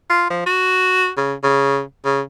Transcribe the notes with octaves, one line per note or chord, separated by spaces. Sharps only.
F4
F3
F#4
C#3
C#3
C#3